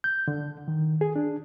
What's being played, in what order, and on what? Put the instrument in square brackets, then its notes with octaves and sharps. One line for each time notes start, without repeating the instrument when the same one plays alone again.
[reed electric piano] G6
D3
D#3
G#4
D4